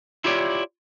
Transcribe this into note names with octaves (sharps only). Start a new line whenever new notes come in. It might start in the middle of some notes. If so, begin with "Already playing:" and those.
E4 F4 G4 C#5 D5